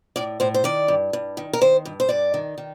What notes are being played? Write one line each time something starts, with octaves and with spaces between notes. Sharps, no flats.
A2 D5
A2 C5
C5
D#3 D5
G2
G2
D#3
A#4
D#3 C5
G2
C5
G2 D5
D#3
D#3